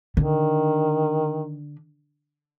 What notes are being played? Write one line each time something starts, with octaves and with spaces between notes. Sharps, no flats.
D3 D#3